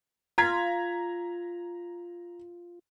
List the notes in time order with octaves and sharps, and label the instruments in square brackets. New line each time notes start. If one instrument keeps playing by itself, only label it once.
[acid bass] F4 [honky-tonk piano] A#5 G#6 B6